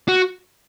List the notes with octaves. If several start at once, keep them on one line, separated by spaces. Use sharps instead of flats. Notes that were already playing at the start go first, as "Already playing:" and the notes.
F#4